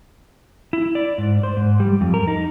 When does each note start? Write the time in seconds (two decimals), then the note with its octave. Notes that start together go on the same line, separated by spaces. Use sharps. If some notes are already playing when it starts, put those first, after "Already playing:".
0.73 E4
0.95 D5
1.18 G#2
1.43 C5
1.57 G#2
1.80 G3
2.01 F2
2.14 A#4
2.28 D#4